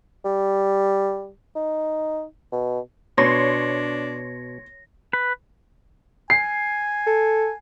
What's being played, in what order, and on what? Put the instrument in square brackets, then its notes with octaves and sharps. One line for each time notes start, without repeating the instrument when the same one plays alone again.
[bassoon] G3
D#4
B2
[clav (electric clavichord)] B2 [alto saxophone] D4 [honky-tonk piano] C#5 C6 [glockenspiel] A#6
[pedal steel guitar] B4
[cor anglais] G#5 [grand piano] C7
[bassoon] A4